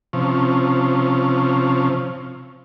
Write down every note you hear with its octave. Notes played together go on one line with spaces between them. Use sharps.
C3 F3 C#4